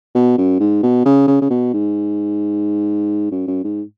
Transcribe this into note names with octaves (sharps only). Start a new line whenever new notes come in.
B2
F#2
G#2
B2
C#3
C#3
C#3
B2
G#2
F#2
F#2
G#2